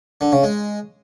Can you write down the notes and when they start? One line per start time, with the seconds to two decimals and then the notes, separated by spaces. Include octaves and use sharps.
0.21 D3
0.32 C#3
0.43 G#3